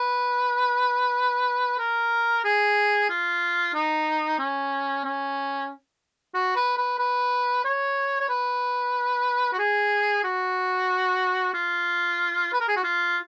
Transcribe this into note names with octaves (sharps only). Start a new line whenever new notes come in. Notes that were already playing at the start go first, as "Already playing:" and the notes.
Already playing: B4
A#4
G#4
F4
D#4
C#4
C#4
F#4
B4
B4
B4
C#5
C#5
B4
F#4
G#4
F#4
F4
B4
A#4
G#4
F#4
F4